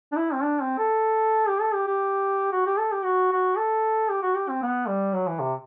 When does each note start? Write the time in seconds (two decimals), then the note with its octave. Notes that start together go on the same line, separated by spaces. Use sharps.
0.12 D4
0.17 E4
0.33 C4
0.43 D4
0.61 C4
0.78 A4
1.48 G4
1.61 A4
1.74 G4
1.87 G4
2.52 F#4
2.66 G4
2.78 A4
2.92 G4
3.04 F#4
3.32 F#4
3.57 A4
4.09 G4
4.22 F#4
4.35 G4
4.49 C4
4.62 B3
4.88 G3
5.14 F#3
5.27 E3
5.40 C3